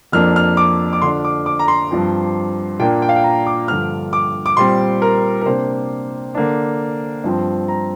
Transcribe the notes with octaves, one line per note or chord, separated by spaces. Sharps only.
F2 F3 A#3 D4 F6
F6
D6
D6
D3 F3 D4 C6
D6
D6
A#5
C6
G2 F3 C4
A#2 A#3 D4 G5
G5
F5
G5
A#5
D6
G2 D3 F3 F6
D6
D6
A#2 G3 C4 C6
A#4
A#4
C3 A#3 D4 C5
D3 A#3 D4
G2 F3 C4
A#5